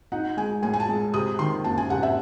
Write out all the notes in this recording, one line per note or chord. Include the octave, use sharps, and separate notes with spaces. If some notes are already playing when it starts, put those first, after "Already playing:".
D#4 F#5
G#3 G#5
A2 G#5
G#5
A5
G#3
C3 D#6
D#3 C6
F#1 A5
G#5
C3 F#5
E5